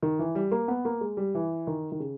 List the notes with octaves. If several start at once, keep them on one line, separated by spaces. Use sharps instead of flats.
D#3
E3
G3
A#3
B3
A#3
G#3
G3
E3
D#3
D#3
C#3